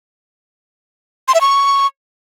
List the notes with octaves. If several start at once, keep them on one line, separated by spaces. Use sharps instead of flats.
C6
E5
C#6